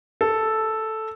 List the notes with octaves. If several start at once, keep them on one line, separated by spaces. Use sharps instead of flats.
A4